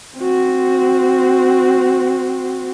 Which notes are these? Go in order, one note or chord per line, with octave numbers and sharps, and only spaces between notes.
C4 F#4